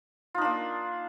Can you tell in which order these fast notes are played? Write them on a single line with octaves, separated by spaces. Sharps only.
F4 D#4 D4 A#3